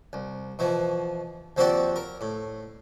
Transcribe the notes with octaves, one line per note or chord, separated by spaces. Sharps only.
C2
B2 E3 F3
D#2 F3 C4 F#4 G4 D5
A#4
A2